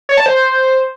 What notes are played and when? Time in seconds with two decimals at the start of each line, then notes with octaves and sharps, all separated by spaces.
0.09 C#5
0.17 A5
0.26 C5